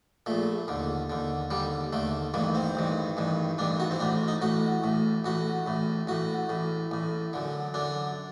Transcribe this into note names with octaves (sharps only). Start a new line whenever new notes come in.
A#1 A#2 A3
D#2 D3
D#2 D3
D#2 D3 G3
D#2 D3 A3
A1 G2 D#3 A#3
C4
A1 G2 D#3
A1 G2 D#3
A1 G2 D#3 D4
F#4
C4
A1 A2 D4
D#4
A1 A2 F#4
A1 A2
A1 A2 F#4
A1 A2
A1 A2 F#4
A1 A2
A1 A2
F#2 D3
F#2 D3 D4